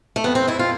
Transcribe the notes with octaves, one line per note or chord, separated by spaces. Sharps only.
A3
F2 B3
C4
F2 E4
F4